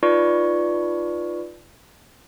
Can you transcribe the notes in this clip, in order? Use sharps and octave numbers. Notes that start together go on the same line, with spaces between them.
D#4 F4 B4 D5 C#6